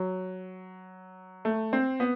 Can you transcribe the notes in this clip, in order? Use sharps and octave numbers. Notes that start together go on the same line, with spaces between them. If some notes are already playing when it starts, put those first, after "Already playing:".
Already playing: F#3
A3
C4
B3